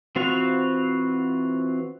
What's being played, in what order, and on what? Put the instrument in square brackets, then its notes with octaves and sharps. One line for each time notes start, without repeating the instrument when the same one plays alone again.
[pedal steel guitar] E3 C4 F4 F#4 F5